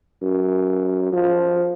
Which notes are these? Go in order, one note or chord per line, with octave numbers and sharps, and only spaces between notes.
F#2
F3